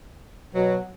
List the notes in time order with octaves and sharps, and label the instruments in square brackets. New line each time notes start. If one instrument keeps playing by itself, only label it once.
[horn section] B2 F#3